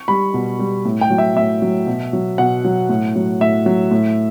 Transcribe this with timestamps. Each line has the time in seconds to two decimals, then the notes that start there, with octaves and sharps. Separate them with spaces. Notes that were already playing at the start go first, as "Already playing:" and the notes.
Already playing: C#6
0.08 G3 B5
0.34 B2
0.59 G3
0.85 A2
1.01 G5
1.10 F#3
1.18 E5
1.36 A2 E5
1.62 F#3
1.87 B2
2.13 F#3
2.38 B2 F#5
2.64 F#3
2.89 A2
3.15 F#3
3.41 A2 E5
3.66 F#3
3.91 A2